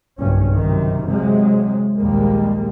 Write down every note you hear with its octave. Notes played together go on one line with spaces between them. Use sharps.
F#1 B1 G2 B2 C#4
F#2 C3 D#3
C3 F#3 G#3
A#1 D#2 G3 G#3 A#3